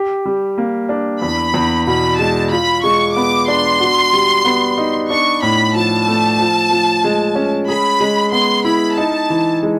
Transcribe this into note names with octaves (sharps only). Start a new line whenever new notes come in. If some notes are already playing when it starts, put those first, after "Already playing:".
Already playing: G4
G3
A#3
D4
E2 B5
E2
B2 B5
G#3 A5
F4 B5
G#3 C#6
B3 D6
D4 C6
F#4
G3
B3
D#4
D4 C#6
A2 B5
F3 A5
A3
F3
F3
G#3
C#4
G#4 B5
G#3
B3 C6
E4 B5
D#4 A5
E3
G#3